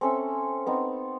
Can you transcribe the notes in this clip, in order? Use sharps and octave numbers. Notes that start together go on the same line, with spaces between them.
C4 C#4 A4 E5
B3 C4 D#4